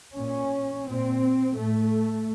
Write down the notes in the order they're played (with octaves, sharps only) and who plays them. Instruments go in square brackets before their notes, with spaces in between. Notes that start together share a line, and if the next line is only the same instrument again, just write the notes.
[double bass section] A#2 C#4
A#2 C4
A2 A3